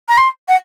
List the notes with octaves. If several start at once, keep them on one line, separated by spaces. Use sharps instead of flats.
A#5
C6
F#5